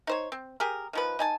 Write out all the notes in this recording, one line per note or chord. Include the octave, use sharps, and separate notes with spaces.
D#4 C5 C#5
C4
G4 G#4 A#4
D#3 F3 B4
D#4 G#5 A5